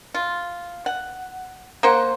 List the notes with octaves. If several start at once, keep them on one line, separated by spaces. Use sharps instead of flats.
F4
F#5
A#3 C5 F#5